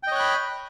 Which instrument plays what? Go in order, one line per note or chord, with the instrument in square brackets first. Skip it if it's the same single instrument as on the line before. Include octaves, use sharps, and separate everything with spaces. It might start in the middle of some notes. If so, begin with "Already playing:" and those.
[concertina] G5
D#5
C#5
F#6
B5